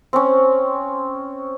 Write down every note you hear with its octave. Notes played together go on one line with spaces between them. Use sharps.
C4 C#4